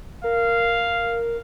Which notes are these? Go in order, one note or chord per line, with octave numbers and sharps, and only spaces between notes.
A#4 F5